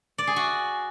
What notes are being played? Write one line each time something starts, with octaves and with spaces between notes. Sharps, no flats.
D5
G#4
F#4